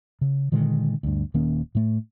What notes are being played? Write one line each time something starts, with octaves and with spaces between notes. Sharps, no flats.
C#3
A#2 D3 D#3 G#3
D2 G2
D#1 D#3 A#3 C#4
A2 A3